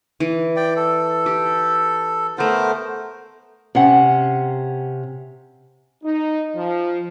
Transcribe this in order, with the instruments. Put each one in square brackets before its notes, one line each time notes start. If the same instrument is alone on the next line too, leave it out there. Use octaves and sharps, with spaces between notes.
[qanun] E3
[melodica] D5 G5
A4
[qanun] G4
[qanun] A3 A4 [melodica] B3 A#4 C5
[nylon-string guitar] C3 C#4 F#5
[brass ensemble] D#4
F3